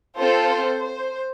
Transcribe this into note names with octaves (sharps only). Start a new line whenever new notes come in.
C4 F4 A4 C5
C5
C5